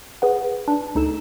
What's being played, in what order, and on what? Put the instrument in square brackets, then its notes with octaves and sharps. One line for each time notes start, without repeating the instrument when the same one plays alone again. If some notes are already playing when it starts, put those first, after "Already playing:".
[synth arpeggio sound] G#4 B4 F#5
D4
D2 D#4 A4 E7